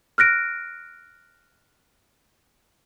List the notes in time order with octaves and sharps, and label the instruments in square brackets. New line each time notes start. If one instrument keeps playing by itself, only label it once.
[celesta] F6 F#6 A#6 D7